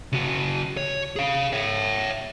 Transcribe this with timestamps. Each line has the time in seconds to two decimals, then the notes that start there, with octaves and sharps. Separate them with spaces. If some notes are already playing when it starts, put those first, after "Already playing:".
0.13 C#3 F#4
0.77 C#5
1.16 G#4 F5
1.53 C#5 E5